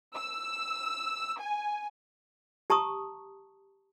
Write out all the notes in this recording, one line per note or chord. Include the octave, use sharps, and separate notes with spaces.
E6
G#5
G4 A5 A#5 C#6 D#6